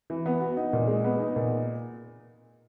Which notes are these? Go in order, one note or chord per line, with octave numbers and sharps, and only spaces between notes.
E3
B3
F#4
D#4
A#2
G#3
B3
D#4
A#2